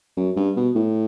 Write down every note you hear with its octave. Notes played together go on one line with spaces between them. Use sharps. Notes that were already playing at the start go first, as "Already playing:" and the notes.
F#2
G2
B2
A2